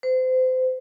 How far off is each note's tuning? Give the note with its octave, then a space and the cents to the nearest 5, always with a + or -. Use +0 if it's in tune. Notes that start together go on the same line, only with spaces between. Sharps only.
C5 -30